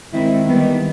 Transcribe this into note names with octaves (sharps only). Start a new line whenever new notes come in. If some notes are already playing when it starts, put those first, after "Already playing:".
D#3 G#3 C4 E4
D#3 G3 B3